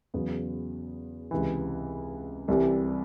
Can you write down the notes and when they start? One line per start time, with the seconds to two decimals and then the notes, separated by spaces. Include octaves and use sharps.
0.14 E2 C#3 F#3 B3
1.31 C#2 C3 E3
2.48 C2 C3 E3 G3